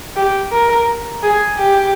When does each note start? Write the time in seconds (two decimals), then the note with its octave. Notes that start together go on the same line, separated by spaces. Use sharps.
0.16 G4
0.52 A#4
1.23 G#4
1.58 G4